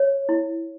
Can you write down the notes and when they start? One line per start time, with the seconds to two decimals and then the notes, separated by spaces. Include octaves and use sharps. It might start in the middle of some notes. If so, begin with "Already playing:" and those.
Already playing: C#5
0.29 E4